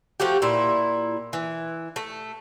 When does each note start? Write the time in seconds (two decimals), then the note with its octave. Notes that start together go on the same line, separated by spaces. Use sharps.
0.20 F3 A3 F#4 G4
0.42 A#2 E4
1.33 E3
1.96 A3